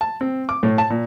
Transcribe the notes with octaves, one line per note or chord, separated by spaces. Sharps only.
A5
C4
D6
A2
A5
A#2